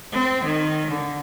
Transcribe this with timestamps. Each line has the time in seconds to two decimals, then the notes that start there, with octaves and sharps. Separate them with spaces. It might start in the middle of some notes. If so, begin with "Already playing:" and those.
0.12 C4
0.44 D#3
0.91 D3